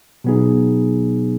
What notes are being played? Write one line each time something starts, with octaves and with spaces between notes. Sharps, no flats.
B2 F#3 B3 D#4 G#4